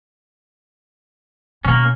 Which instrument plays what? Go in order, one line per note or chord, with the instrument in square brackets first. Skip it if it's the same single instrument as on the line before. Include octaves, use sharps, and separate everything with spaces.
[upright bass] B2 B3 [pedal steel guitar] A#3 C#4